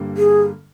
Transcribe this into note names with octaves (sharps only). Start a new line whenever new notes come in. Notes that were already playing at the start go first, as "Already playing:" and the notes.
Already playing: G2 D3 G3 A#3
G#4